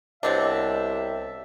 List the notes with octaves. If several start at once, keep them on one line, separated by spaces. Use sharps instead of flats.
C2 B2 C4 D4 C#5 D#5 E5